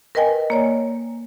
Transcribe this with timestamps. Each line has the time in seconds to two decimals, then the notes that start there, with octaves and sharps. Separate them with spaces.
0.15 A#4 B4 D#5 G5 G#5
0.50 A#3 C#5 D5